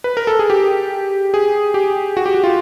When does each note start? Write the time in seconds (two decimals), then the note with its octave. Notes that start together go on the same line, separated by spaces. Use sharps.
0.04 B4
0.17 A#4
0.27 A4
0.39 G#4
0.50 G4
1.34 G#4
1.74 G4
2.17 F#4
2.26 G4
2.35 F#4
2.44 F4